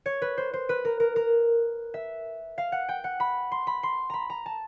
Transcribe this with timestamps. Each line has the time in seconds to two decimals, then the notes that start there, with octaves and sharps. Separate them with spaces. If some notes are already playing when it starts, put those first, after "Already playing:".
0.06 C#5
0.22 B4
0.38 C5
0.53 C5
0.69 B4
0.85 A#4
1.00 A#4
1.16 A#4
1.94 E5
2.58 F5
2.72 F#5
2.89 G5
3.04 F#5
3.20 B5
3.52 C6
3.67 B5
3.83 C6
4.10 A#5 B5
4.30 A#5
4.46 A5